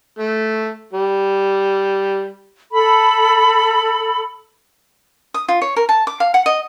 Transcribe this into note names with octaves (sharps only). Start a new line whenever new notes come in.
A3
G3
A4 B5
D#6
F4
C#5
A#4
A5
D6
F5
F#5
D#5